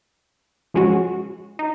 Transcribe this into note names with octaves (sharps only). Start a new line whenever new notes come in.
F3 G#3 C#4 F#4
D#4